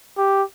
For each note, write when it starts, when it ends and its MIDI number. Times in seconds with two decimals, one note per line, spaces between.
0.18 0.43 67